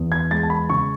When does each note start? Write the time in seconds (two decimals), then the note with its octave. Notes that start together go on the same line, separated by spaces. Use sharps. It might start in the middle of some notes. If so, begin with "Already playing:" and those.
Already playing: E2 B3
0.12 G#6
0.31 G#3 A6
0.43 A5
0.50 B5
0.70 C#3 C#6